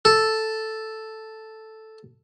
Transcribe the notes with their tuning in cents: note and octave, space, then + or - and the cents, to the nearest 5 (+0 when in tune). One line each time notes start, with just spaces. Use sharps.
A4 +0